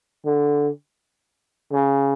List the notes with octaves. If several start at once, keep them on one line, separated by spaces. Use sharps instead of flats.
D3
C#3